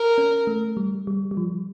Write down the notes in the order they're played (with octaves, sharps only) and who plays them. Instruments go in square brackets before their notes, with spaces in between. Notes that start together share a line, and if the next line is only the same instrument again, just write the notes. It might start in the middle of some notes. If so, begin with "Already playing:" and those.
Already playing: [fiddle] A#4
[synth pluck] C#4
A3
G3
G3
G3
F3